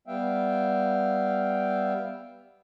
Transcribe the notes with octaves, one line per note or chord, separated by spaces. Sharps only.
G3 B3 E5 F5 G5